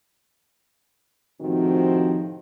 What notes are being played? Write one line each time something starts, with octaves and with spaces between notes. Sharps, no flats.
A2 C3 D#3 F3 C4 F#4